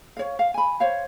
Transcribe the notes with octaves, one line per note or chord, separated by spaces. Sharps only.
C#5 F5
F5
G#5 B5
C5 C#5 F5